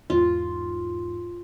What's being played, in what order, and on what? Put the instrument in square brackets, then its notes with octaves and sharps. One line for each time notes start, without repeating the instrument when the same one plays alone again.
[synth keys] E2 G#2 [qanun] F4